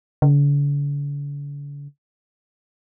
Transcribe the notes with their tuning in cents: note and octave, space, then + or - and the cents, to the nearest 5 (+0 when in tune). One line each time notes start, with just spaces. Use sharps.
D3 -45